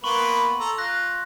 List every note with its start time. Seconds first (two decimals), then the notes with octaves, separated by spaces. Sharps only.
0.04 A#3 B3 B4 C6 C#6 F#7
0.59 A4 A#5
0.78 F4 F#6 A#6